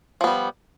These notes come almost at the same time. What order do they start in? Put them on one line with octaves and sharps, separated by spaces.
F3 B3 G3